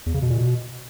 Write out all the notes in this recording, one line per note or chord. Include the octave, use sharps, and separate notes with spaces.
E2
C#3
B2
A#2
B2